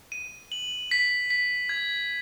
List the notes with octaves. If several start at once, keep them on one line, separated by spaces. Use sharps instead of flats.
D#7
F#7
B6
B6
G#6